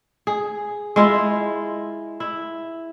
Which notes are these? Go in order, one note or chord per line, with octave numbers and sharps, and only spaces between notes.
G#4
G#3 E4 F4
E4